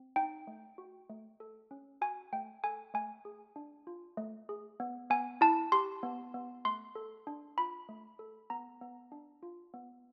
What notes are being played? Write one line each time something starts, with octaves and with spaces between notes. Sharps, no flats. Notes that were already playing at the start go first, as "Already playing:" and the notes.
Already playing: C4
D#4 G5
A3
F#4
A3
A4
C#4
F#4 G#5
A3 G5
A4 G#5
A3 G#5
G#4
D4
F4
A3
G#4
B3
B3 G#5
E4 A5
G4 C6
B3
B3
A3 C6
A4
D4
F4 B5
A3
A4
B3 A#5
B3
D4
F4
B3